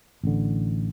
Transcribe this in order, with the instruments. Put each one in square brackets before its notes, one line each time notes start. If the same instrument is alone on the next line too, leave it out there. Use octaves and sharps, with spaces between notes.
[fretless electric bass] A1 D3